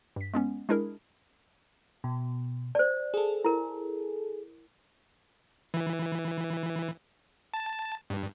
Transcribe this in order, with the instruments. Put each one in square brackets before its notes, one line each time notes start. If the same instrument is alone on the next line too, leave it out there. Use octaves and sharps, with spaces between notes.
[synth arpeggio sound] G2 B6
G#3 B3 C#4
G#3 D4 E4 G#4 A#4
[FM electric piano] B2
[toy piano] C5 D5
[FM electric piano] G#4 A4
[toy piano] E4 A#4
[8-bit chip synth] E3
A5
G2